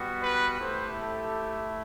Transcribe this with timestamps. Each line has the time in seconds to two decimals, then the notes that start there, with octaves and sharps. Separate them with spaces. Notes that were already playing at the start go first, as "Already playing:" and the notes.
Already playing: G3 B3 F#4
0.21 B4
0.60 A3 E4 G4 C5
0.99 A4